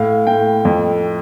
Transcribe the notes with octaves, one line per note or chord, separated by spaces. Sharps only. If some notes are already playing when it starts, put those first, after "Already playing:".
Already playing: A2 F5
A2 G5
F2